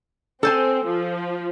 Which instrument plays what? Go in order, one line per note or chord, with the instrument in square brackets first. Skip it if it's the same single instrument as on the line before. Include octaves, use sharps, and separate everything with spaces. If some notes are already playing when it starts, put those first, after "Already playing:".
[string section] C4 [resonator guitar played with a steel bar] A4 C5 G#5
[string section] F3